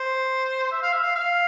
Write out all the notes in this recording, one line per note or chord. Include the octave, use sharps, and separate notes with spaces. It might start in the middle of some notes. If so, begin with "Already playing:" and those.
Already playing: C5
E5
F5
E5
F5
F5